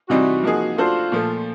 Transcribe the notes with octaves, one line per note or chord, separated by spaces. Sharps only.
C3 E3 G3 C4 D#4 F#4
F3 A#3 D#4 G#4
A3 D4 F4 F#4 A4 C5
A#2 F3 A3